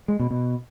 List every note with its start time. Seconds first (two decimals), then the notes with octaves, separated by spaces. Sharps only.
0.08 G#3
0.20 B2
0.31 B2